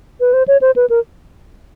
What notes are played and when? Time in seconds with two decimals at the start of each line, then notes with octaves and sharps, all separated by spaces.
0.20 B4
0.33 C5
0.48 C#5
0.61 C5
0.76 B4
0.90 A#4